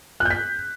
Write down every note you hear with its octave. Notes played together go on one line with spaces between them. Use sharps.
F#6
G6
B6